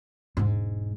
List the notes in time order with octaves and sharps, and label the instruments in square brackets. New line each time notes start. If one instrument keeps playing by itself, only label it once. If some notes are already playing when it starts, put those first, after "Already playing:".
[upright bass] E1 G#2